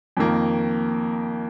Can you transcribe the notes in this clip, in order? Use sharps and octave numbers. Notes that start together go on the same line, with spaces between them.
F2 D#3 A#3